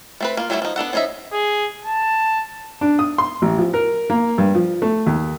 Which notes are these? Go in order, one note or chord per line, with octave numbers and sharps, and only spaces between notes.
A3 C4 B4
A#3 F4
F#3 G3 A3 B3 E4
F3 D#4
B3 D4 A4 F#5
F3 C#4 D#4 D#5 E5
G#4
A5
D4
D#6
C6
A1
F3
A#4
A#3
G2
F3
A3
D#2